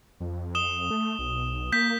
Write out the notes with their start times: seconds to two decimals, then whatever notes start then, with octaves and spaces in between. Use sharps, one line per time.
0.20 F2
0.55 D#6 E7 G7
0.91 A3
1.19 B1
1.72 A#3 G6 B6